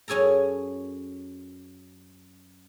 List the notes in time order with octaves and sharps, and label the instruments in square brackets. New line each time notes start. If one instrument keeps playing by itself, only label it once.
[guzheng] F#2 C#4 G#4 A4 A#5